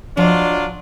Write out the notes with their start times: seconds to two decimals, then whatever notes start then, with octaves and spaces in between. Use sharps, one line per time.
0.17 F3 F#3 D4 F4 D#5